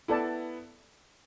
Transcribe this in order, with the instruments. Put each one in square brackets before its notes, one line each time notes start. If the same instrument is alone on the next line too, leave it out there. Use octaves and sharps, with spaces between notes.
[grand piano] B3 E4 [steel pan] A4 D5 A5